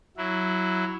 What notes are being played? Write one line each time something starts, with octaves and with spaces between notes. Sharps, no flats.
F#3 E4